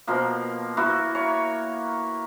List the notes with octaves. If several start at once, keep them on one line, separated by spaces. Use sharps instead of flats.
B2 F3 A#3
A#3 E4 F#4
C#5